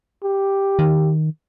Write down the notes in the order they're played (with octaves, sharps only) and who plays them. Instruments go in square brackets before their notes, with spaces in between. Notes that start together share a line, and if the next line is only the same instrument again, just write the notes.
[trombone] G4
[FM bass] D#3